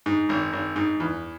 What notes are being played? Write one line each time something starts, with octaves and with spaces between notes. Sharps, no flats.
G#2
G#1
G#1
G#2
E2